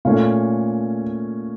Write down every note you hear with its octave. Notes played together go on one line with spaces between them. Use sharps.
A#2 A3 C#4 F5